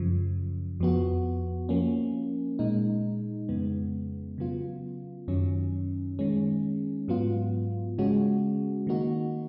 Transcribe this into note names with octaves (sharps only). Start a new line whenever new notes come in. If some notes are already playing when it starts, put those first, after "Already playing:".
Already playing: F#2 C#3 F3
F2 F3 B3 F#4
F3 A#3 C#4
A#2 G#3 D#4
F2 C#3 G#3 B3
C#3 F#3 B3 F4
F#2 D#3 F#3 C#4
D#3 G#3 C#4
G#2 F#3 B3 F4
C#3 G#3 C#4 F#4
D#3 A#3 D#4 F#4